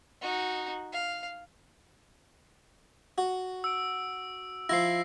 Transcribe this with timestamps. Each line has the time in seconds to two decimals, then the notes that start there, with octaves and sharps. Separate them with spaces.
0.21 D#4 F#4
0.93 F5
3.18 F#4
3.64 E6 D7
4.69 F3 E4 A#6 C7